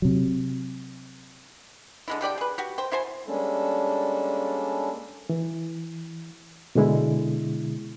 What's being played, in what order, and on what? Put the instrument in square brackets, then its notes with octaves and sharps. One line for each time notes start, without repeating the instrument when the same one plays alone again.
[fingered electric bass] C3 F#3
[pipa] D3 G#3 E4
D3 G4 D5 G5
G#4 B4
F#4 G4
C5 G5
E4 F#4 C5 G#5
[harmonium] G3 G#3 A#3 C#4 D4 A4
[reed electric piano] E3
B2 D3 G#3 E4